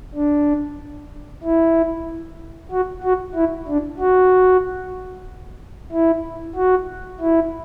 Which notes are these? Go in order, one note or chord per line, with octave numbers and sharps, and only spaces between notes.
D4
E4
F#4
F#4
E4
D4
F#4
E4
F#4
E4